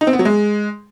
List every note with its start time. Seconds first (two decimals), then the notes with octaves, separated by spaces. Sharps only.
0.01 D#4
0.07 C4
0.13 B3
0.19 F#3
0.25 G#3